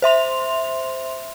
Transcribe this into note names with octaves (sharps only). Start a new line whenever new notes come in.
C5 E5 C6 F7